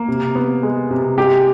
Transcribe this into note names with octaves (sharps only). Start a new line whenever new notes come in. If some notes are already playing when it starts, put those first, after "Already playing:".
Already playing: A#3
C3
B3
G#3
C3
G#3 G4